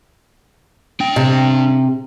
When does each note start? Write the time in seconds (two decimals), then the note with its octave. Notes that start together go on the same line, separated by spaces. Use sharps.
1.00 D4 G5
1.16 C3